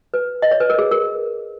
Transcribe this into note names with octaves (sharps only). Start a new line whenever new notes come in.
B4
D#5
C#5
B4
A#4
G#4
A#4